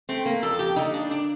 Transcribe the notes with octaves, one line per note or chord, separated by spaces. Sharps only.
A3 C4
A#3
F2 A4
G4
D3 G3 A#3 D#4
D4
D4